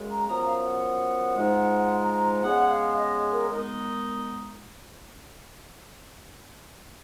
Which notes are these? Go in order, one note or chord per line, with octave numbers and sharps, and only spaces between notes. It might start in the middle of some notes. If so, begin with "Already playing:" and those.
Already playing: F#2 C#3 G#3
A#5
F#2 F3 B3 A#5
F5
F#5
G#2 F3 G#3 D#4
A#5
A#5
C#3 G#3 B3 F#5
F5
D#5
A#4
D#3 G#3 B3 D#4 A#4